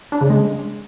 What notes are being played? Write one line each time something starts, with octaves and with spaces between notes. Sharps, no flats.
D4
C#3
G#3